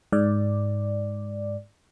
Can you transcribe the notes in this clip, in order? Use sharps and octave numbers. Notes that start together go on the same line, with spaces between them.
G#2 D5